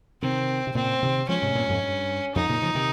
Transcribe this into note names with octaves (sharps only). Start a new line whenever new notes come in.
C3 D#3 C4
C3
A#2 C#3 C4
C3 D#3
F3 G#3 C#4
G#2 C3
G2 A#2
F2 G#2
G2
F2 D#4
A#2 C#3
C#3 F3
C3 D#3